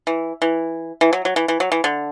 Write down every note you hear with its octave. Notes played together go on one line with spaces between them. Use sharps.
E3
E3
E3
F#3
F#3
E3
E3
F#3
E3
D3